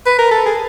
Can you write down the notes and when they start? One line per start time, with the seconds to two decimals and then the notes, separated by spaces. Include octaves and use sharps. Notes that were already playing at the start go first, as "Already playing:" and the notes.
0.06 B4
0.19 A#4
0.31 A4
0.46 G#4